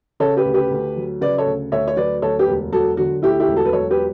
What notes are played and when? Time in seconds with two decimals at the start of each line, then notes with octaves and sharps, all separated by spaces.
0.20 C#3 A4 C#5
0.37 G4 B4
0.46 D2
0.54 G4 B4
0.71 D2
0.97 F#3
1.21 C#3 B4 D5
1.38 A4 C#5
1.46 D2
1.72 D2 C#5 E5
1.88 C#5
1.96 F#3 B4 D5
2.22 D2 A4 C#5
2.39 G4 B4
2.48 E1
2.72 F#3 F#4 A4
2.97 D3 F#4
3.23 D2 E4 G4
3.40 E4 G4
3.48 E1
3.56 F#4 A4
3.65 B4
3.73 F#3 A4 C#5
3.91 G4 B4